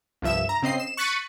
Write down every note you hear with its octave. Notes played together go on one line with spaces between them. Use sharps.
C2 G2 F3 E5 E7
A#5
C#3 C4 D#5 C7
E7
C#6 F#6 A6 B6 C#7 D#7